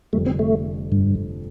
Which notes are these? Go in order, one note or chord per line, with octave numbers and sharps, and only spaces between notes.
F1 F2 D3 G3 A3
C4
A3
G2